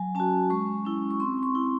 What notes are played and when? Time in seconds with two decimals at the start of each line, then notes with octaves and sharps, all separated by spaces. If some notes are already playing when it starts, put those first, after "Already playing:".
Already playing: F#3 G#5
0.15 C#4 F#4 A5
0.50 G#3 C#6
0.85 C#4 E4
1.11 C#6
1.20 C4 C6
1.43 C#6
1.55 E4